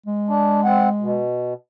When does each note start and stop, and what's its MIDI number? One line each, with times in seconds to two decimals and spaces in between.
0.06 1.22 56
0.29 0.61 62
0.64 0.89 60
0.64 0.89 78
1.00 1.54 47